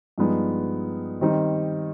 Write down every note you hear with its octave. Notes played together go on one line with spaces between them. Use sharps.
G2 F3 G#3 B3 D#4
D#3 G3 C4 D#4